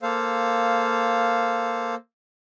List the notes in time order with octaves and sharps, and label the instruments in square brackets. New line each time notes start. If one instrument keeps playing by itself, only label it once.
[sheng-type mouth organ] A#3 A4 C5 F5